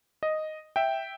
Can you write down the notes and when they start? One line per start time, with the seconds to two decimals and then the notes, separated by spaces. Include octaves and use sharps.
0.23 D#5
0.76 E5 G5